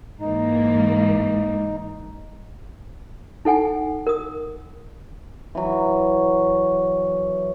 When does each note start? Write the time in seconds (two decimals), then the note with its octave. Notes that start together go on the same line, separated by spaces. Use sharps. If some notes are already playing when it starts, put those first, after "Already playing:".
0.21 G#2 E3 A#3 D#4
3.45 D#4 A4 F#5 G#5
4.07 A#4 D#6
5.55 E3 F#3